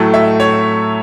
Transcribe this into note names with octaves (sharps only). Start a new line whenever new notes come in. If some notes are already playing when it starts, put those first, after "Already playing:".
Already playing: A2 F#3 A3 A5
E5
C#5